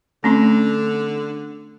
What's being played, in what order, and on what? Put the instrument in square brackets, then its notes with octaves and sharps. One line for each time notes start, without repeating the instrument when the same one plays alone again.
[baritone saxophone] D3 [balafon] A3 C4 C#4